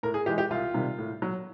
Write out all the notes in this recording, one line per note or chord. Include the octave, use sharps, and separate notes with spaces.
A2 A#4
G#4
E3 G#3 G4
G4
C2 F4
C3 D#3 G3
A2
F#3